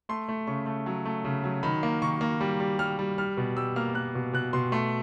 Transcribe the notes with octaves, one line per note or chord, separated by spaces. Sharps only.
A3 C6
A3
C#3 C#6
A3
F#3
A3
C#3
F#3
D#3 B5
A#3
D#3 C#6
A#3
G3
G3
G3 F6
G3
G3 F6
B2
G3 E6
A#3 F6
A#3 F#6
B2
B2 F#6
B2 C6
A3 C6